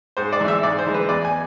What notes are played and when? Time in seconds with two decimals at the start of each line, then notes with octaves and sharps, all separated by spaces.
0.17 G#2 C5
0.33 D5
0.40 E3 G#3
0.48 E5
0.63 G#2 D5
0.79 C5
0.86 E3 G#3
0.94 B4
1.09 E2 D5
1.25 G#5